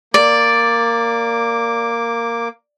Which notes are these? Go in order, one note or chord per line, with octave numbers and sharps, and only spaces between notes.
A#3 D5 D6